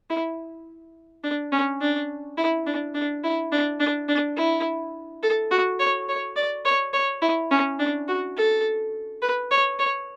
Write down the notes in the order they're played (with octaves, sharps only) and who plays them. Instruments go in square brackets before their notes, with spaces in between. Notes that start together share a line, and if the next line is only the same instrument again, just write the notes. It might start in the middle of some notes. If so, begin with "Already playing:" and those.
[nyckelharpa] E4
D4
C#4
D4
E4
D4
D4
E4
D4
D4
D4
E4
A4
F#4
C#5
C#5
D5
C#5
C#5
E4
C#4
D4
F#4
A4
B4
C#5
C#5